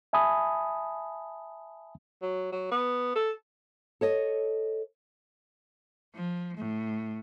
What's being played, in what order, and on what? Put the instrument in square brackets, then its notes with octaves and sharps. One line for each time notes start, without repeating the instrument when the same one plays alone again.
[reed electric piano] E5 G#5 A5 B5 D#6
[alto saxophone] F#3
F#3
B3
A4
[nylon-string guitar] A4 C#5 D#5
[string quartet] F3
A2